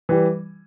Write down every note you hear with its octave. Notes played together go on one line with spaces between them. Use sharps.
E3 G3